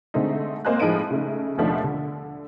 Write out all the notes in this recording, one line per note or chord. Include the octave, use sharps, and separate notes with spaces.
D3 G#3 A3 C4 D#4
G#1 A#3 C5 D#5 G#5 F#6
A2 F3 G#3 D#4 D7 D#7
C#3 A3 D#4
D#2 B2 F3 A3 D4 D#4
D3